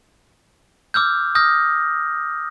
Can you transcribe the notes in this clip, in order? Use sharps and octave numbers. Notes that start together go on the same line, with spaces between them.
D6 E6 F6 G6
D#6 F6 G6 A#6